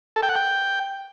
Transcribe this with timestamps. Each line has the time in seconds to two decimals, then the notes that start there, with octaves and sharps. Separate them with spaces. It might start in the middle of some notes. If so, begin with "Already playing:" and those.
0.16 A4
0.23 G5
0.29 F#5
0.36 G5